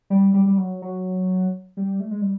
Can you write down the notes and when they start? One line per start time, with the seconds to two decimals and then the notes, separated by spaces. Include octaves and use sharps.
0.10 G3
0.34 G3
0.46 G3
0.58 F#3
0.82 F#3
1.77 G3
2.00 A3
2.11 G#3
2.21 G3